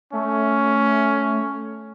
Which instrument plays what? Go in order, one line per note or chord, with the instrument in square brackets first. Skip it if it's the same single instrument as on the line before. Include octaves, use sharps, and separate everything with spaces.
[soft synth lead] A3 [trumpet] C#4